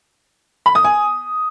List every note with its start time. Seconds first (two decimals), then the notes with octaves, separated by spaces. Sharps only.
0.66 B5
0.75 D#6
0.85 G#5